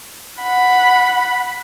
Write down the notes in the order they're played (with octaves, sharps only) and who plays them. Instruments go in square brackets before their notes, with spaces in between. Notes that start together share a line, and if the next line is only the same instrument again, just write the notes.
[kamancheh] F#5 B5